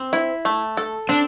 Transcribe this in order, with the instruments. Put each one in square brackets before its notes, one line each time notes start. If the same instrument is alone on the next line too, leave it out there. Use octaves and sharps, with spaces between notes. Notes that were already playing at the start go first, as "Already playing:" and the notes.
Already playing: [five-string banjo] C4
E4
A3
A4
[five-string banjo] C4 [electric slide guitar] D4